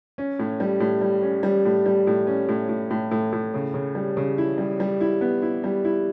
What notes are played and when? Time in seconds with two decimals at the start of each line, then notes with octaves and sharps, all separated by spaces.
0.18 C#4
0.39 A2
0.60 G3
0.80 A2
1.01 G3
1.22 C#4
1.43 G3
1.65 A2
1.86 G3
2.07 A2
2.27 C#4
2.48 A2
2.69 A2
2.90 A2
3.11 A2
3.32 A2
3.54 C#3
3.74 C#3
3.95 G3
4.17 C#3
4.38 E4
4.58 G3
4.80 G3
5.01 E4
5.21 B3
5.42 E4
5.64 G3
5.85 E4